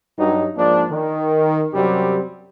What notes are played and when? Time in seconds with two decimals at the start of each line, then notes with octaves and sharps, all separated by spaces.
0.19 G2 F#3 D#4
0.57 G#2 F3 A#3 D4
0.91 D#3
1.73 F#2 C3 F#3 G3 C4 G4